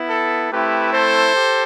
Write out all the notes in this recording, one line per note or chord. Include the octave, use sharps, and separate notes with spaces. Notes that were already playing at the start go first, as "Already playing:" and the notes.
Already playing: B3 E4
A4
A3 C4 E4 G4 B4
A4 C5
G4